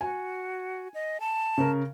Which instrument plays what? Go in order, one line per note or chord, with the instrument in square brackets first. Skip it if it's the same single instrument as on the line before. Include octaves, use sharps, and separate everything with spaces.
[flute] F#4 [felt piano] G#5
[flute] D#5
A5
[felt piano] C#3 A#4